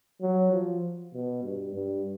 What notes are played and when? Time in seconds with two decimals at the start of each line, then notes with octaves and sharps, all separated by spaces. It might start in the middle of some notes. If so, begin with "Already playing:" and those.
0.21 F#3
0.52 F3
1.14 B2
1.44 G2
1.75 G2